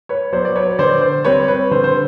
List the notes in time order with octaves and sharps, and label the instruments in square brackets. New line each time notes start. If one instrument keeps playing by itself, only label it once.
[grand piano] B4 C#5
F#3 B3 C5 D5
D5
B4 C#5
D3 C5 D5
C5
G3 C4 B4 C#5
B4
D3 C5
C5